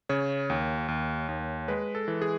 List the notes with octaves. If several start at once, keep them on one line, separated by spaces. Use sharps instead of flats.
C#3 C#5
D#2
D#2
D#2
G#3 B4
A4
E3
G#4